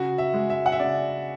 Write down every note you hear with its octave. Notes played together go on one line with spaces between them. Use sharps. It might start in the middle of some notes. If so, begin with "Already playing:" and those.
Already playing: C#3 F#4
E5
G#3
E5
F#5
E5
C#3 D5